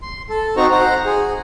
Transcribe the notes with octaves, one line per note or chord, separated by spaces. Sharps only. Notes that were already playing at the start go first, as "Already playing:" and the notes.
C6
A4
C4 D#4 F#4 C5 A#5 C#6
C5 F#5 A#5
G#4